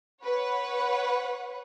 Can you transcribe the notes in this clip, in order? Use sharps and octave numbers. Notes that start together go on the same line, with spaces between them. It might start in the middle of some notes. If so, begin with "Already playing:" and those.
B4 C#5 F#5